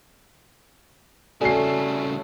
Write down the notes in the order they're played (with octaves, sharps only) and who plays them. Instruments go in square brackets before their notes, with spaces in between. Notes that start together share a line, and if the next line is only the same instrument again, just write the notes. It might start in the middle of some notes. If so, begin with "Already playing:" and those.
[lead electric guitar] C2 C#3 [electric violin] A3 [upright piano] F#4 C7 [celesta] A4 D5 G#5